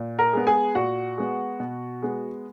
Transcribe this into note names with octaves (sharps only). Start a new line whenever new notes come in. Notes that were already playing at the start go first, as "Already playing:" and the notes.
Already playing: A#2
A#4 A#5
G#3 B3
G#4 G#5
A#2 F#4 F#5
G#3 B3
B2
G#3 B3